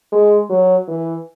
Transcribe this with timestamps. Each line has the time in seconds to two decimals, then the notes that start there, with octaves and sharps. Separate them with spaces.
0.12 G#3
0.50 F#3
0.88 E3